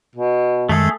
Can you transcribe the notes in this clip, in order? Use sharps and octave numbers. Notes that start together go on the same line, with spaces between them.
B2
F#2 D#3 G#3 A3 G#4 A4